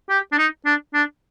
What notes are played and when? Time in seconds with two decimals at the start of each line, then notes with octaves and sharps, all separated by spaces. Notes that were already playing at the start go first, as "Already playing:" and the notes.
0.09 G4
0.32 D4
0.38 D#4
0.65 D4
0.94 D4